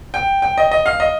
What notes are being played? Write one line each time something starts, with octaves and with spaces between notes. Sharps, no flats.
G5
G5
D#5
D#5
F5
D#5